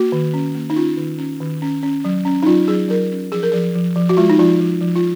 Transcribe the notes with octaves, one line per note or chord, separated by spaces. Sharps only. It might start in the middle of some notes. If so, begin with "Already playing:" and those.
Already playing: A#3 F#4
D#3
C#4
A#3
D#4
C#4 F4
D#3
C#4
D#3
C#4
C#4
F#3
C#4
D#4
F#3 F4
F#3 G#4
F#3 A#4
C#4
F3 G#4
A#4
F3 G#4
F3
F3
F#4
G#3 F4
D#4
F3 F4
F3
F3
F4